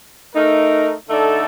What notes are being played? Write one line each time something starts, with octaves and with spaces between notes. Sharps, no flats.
A3 D#4 A#4
D3 A3 D#4 A4 D5